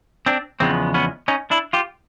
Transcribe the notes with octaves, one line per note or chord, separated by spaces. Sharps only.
C4 D4
E2 C#3 F3 G#3 B3 C4
B3 C#4
C#4 D#4
D4 E4
F4 G4